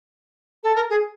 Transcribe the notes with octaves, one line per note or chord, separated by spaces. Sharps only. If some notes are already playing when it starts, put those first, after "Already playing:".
A4
A#4
G#4